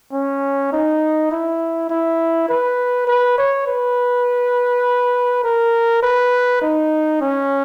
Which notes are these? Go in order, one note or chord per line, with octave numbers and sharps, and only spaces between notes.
C#4
D#4
E4
E4
B4
B4
C#5
B4
A#4
B4
D#4
C#4